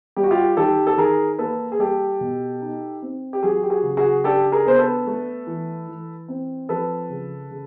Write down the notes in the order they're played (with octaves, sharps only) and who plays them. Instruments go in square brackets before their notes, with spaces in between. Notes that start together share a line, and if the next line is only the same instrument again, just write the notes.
[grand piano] G3 G4
F#4
F4 G4
D#3 G4 A4
A4
D#3 G#4 A#4
A#3 A4 B4
G#4
G3 G4 A4
B2
D#4
C4
G4
F#3 F#4 G#4
G4
F#4 G#4
C#3
F#4 G#4
D4 G4 A4
G#4 A#4
B3 C5
A4 B4
A3
E3
E3
C4
F3 A4 B4
C#3
C#3